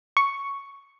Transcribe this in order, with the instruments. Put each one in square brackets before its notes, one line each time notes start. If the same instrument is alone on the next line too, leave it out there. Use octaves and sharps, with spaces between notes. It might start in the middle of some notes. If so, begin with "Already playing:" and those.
[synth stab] C#6